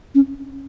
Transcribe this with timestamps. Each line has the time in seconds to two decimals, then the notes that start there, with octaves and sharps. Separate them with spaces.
0.15 C#4